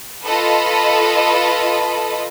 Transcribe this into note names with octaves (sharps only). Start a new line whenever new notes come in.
F4 A4 B4 D#5 B5